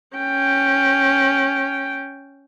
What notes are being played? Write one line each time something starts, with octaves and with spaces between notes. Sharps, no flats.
C#4 G5